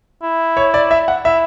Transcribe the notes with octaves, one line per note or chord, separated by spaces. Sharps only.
E4
C#5
D5
E5
F#5
E4 E5